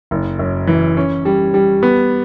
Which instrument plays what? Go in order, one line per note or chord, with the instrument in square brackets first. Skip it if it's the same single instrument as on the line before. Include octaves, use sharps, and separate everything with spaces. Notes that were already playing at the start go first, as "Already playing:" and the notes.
[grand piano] F#1
F#2
E3
C#4
G3
G3
B3